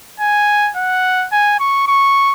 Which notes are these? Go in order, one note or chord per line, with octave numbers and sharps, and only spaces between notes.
G#5
F#5
G#5
C#6
C#6